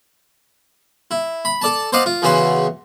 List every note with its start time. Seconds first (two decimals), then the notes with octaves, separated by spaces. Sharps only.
1.11 E4
1.45 B5
1.62 A4 D5 A5
1.93 C5 D5 D#5 F5 F#5
2.06 F4
2.22 E2 C#3 E3 C#4 F#4 C6